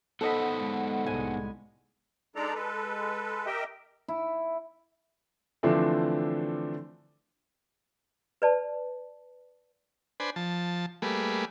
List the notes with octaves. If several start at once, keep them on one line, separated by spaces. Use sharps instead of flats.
B3 D#4 A4 C5 D#5 F#5 B5
G#3
C2 A2 G#3 G#5
G#3 D4 D#4 A4 D5 A#5
G#3 A4 B4
G4 A#4 D#5 E5 G5
E4
D3 E3 F3 A3 C4 D4
B4 D5 A5
D4 B4 C5 G#5
F3 A5
G3 A3 A#3 G#4 B4